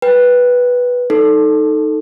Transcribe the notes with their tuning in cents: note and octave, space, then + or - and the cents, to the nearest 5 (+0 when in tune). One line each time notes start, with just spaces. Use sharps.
B4 -5 G5 +0
D#4 +0 A4 +0